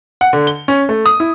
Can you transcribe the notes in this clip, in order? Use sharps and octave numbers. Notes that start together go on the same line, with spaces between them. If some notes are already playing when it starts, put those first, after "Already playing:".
F#5
D3
G7
C#4
A3
D#6
E4